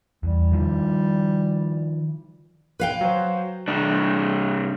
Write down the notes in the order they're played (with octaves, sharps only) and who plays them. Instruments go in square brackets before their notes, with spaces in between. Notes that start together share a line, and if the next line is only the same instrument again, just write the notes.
[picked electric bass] E2 [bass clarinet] G3
[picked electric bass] D#3 F3
[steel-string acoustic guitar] B4 F5 G5
[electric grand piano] F#3 C5
[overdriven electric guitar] C2 D4